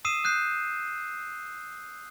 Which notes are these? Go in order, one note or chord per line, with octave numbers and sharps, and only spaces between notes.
D#6 E6 C7 D#7 E7
D#6 F#6 G6 C7